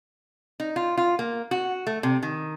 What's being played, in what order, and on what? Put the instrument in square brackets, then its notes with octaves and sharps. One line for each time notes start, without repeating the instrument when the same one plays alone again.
[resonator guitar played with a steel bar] D#4
F4
F4
A#3
F#4
A3
C3
D#3